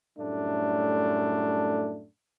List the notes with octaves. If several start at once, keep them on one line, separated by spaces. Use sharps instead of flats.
F#2 A2 G3 A3 D4